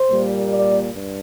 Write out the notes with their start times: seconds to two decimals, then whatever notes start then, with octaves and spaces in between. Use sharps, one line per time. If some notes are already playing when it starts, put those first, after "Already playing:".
Already playing: C5
0.09 A#2 G3 A#3
0.50 D5
0.92 G2